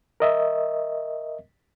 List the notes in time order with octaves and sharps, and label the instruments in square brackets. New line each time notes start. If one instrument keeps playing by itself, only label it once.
[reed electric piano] A#4 D#5 E5